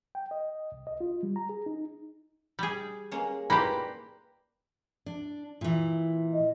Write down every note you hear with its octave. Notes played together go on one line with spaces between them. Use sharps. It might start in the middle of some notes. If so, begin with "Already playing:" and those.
G5
D#5
C2
D#5
F4
G3
A#5
G#4
D#4
G3 G#4
G#3 A#3 C#4
G3 A#3 G4 B4 C5 B5
D4
A#2 E3
D#5